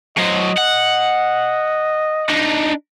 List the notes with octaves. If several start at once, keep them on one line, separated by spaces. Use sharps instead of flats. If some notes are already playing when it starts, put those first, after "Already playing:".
F#3 C5 D#5
F#5
D4 D#4